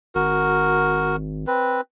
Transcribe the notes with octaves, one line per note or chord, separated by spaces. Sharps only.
G#1 F#4 A#4
C4 B4